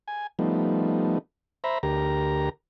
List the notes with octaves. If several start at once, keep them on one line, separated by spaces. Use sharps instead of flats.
G#5
F3 G3 A3 B3 D#4
C5 E5 A#5 B5
D2 G4 A#4 A#5